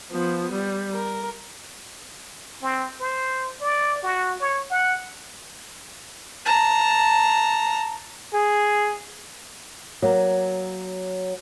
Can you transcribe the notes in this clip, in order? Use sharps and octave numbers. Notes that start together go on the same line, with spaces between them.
F3 B3
G3
A#4
C4
C5
D5
F#4
C#5
F#5
A5 A#5
G#4
F#3 A#3